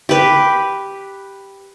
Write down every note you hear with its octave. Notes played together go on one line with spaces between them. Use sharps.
G4 B4